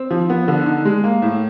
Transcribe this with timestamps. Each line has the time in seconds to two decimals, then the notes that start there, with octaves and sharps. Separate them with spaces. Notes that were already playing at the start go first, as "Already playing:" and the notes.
Already playing: C4
0.11 F3
0.30 B3
0.48 D3
0.66 D#4
0.85 G#3
1.04 A#3
1.22 A2